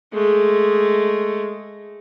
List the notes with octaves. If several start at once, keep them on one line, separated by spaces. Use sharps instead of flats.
G#3 A3